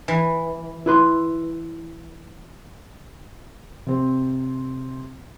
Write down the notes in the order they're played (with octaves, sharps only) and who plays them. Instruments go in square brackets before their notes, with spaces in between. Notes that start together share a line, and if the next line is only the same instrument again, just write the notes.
[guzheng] E3
[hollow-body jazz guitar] E4 B4 C6
[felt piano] C3 C4